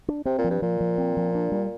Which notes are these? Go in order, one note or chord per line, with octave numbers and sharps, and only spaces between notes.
D4
C3 C4
A#2
F3
G2
A#2 F3
F3
C4
F3
D4
G3